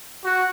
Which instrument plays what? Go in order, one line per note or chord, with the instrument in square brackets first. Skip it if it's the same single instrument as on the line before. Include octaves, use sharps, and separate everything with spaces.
[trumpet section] F#4